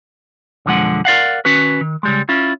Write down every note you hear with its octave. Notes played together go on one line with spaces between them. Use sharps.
B1 F2 D3 F3 G#3 F#5
A#4 D5 F5 F#5
D#3 C#4 F#4 B4
D#3
C#3 G3 G#3
C#4 E4 F4